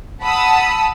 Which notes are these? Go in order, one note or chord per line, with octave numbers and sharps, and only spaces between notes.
F#5 A5 B5 D#6 E6